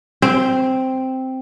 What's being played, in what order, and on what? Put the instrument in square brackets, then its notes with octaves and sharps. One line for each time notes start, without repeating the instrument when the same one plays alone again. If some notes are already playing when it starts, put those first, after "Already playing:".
[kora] C4